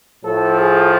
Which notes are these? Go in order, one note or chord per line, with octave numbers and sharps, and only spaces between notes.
A2 F3 A4
G#4